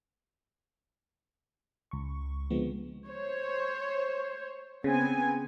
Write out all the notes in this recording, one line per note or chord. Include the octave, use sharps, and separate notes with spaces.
C#2 C#6
D3 F3 G#3 B3 C4
C5 C#5
C#3 B3 C4 G#5